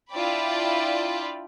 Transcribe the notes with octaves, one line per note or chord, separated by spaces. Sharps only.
D4 E4 F4 D5 G5 B5